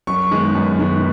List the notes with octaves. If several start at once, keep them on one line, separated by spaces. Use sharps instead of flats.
F#2 C#6
D#3 G#3 B3
F#2
D#3 G#3 B3